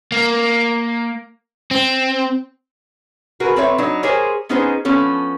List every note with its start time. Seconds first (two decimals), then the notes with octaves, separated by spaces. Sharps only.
0.12 A#3
1.71 C4
3.40 F#4 G#4 A#4 B4
3.56 C4 A4 B4 C#5 E5
3.78 F#3 D4 D#4
4.03 G4 G#4 A#4 C5 C#5 G#5
4.49 B3 C#4 D#4 G#4 B4 C5
4.85 F3 B3 C#4 A4